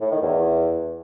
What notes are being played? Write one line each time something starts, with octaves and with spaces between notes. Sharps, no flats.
A2
D#3
E2